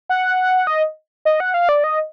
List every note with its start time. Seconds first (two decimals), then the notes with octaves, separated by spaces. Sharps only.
0.09 F#5
0.67 D#5
1.25 D#5
1.40 F#5
1.54 F5
1.69 D5
1.84 D#5